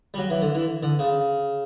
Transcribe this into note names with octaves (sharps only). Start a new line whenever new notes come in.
G3
F#3
E3
D3
E3
D3
C#3